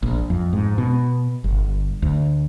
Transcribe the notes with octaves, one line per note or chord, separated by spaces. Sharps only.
A#1
F2
G#2
B2
G1
D2